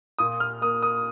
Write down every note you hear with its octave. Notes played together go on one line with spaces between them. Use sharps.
A#2 D#6
F6
A#3 D#6
D#6